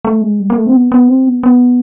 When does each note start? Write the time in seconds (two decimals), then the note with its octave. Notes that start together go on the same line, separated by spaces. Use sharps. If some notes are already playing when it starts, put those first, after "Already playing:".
0.05 A3
0.21 G#3
0.40 G3
0.50 A#3
0.57 A3
0.67 C4
0.74 B3
0.92 B3
1.08 C4
1.26 B3
1.43 B3